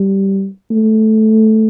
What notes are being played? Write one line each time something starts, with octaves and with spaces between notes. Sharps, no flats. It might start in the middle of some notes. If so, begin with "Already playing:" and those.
Already playing: G3
A3